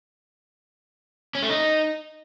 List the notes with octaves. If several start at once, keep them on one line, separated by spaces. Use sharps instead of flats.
C#4
A3
D#4